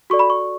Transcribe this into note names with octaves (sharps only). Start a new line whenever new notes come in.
F#4 A4 D5 C#6
B5
C#6